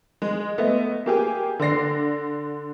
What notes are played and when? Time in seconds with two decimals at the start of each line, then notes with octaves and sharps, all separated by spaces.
0.22 G#3
0.58 A3 B3 D#5
1.06 A#3 G4 G#4
1.59 D3 D5 A#6 C7